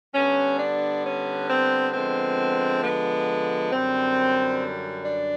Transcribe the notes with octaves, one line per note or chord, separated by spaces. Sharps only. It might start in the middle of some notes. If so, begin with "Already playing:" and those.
D3 G3 B3 C#4
D4
C#4
C4
D3 F3 G#3 B3 C4
B3
F#2 D3 G3 C4
D4